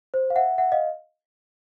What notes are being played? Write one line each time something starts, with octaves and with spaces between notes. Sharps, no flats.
C5
F5
E5 F#5
E5 F#5
D#5 F5